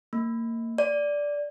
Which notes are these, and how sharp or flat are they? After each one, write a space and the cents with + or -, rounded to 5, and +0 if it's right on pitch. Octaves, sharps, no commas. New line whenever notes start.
A#3 -25
D5 -10